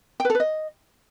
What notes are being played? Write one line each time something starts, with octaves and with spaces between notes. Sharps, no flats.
G5
B4
A4
B4
D#5